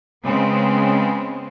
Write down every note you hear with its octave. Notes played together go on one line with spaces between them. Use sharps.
C#3 G#3 B3 C4